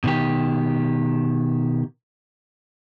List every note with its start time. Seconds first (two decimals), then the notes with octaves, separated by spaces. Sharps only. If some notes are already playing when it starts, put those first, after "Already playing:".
0.04 B2 D#3 G4